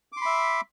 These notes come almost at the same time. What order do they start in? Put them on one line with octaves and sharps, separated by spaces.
D6 C6 B5 E5